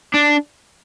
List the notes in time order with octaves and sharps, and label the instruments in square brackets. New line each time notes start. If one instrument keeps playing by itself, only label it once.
[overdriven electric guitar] D4